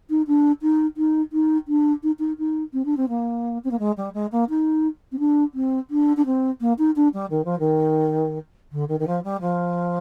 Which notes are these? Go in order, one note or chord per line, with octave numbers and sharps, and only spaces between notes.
D#4
D4
D#4
D#4
D#4
D4
D#4
D#4
D#4
C4
D4
C4
A#3
C4
A#3
G#3
G3
G#3
A#3
D#4
C4
D4
C4
D4
D4
C4
A#3
D#4
D4
G3
D#3
F3
D#3
D3
D#3
D#3
F3
G3
F3